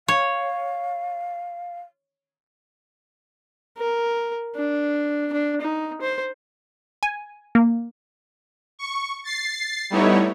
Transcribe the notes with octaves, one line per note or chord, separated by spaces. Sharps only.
C#5 F5
A#4
D4
D4
D#4
C5
G#5
A#3
C#6
A6 C7
G3 A3 B3 D#4 E4 C#5